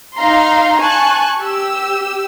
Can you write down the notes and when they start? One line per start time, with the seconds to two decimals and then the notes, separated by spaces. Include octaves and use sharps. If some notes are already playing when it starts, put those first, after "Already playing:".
0.16 D#4 F5 A#5 C6
0.79 G#5 A5 C#6 F#6
1.39 G4 E6